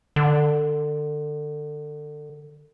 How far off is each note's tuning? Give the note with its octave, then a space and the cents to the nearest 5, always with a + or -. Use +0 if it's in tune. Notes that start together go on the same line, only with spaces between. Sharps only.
D3 +25